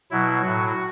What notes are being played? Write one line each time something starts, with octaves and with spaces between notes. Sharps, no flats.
B2 F#3 E4
A2 F#3 F#4